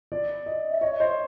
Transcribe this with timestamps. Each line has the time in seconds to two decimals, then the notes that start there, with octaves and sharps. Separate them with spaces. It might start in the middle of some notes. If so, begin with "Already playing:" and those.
0.12 D5
0.46 D#5
0.71 E5
0.81 C#5 D#5
0.99 C5 D#5